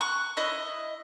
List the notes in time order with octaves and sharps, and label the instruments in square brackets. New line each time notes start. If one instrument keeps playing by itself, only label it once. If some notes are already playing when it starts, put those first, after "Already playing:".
[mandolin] C#6 F#6
E4 D#5